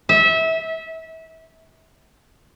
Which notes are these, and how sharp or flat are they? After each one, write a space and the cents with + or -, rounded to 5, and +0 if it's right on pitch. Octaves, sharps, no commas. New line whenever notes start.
E5 -25